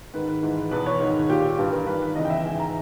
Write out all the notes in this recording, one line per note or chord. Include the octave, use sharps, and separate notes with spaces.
G#2 D#3 B4
G#2 E3
E2 B2 B4
C#5
G#2 D#3
A#2 G4
G2 E3
A#4
G2 D#3 B4
E2 C#3 E3 D#5
G5
E5
G#2 E3 G#5
A#5